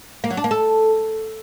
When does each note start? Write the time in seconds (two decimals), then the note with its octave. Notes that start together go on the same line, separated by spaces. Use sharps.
0.24 A#3
0.30 F#3
0.37 D4
0.44 A#3
0.51 A4